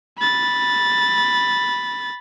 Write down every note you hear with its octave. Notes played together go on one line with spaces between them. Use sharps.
B5 A6